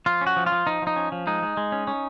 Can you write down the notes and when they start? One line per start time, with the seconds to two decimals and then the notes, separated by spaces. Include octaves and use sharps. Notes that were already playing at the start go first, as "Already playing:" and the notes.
0.06 F3 F4
0.21 C#4
0.27 F#4
0.37 F3
0.46 F4
0.52 F3
0.67 F3 D#4
0.82 F3 D#4
0.96 C#4
1.12 F3
1.27 G#3 D#4
1.43 G#3
1.57 G#3
1.72 C#4
1.87 C#4